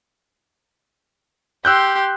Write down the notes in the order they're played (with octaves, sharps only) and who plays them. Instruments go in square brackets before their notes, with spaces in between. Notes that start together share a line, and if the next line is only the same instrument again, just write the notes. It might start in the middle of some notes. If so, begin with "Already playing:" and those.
[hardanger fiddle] G4 C6 [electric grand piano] E6 F#6 G6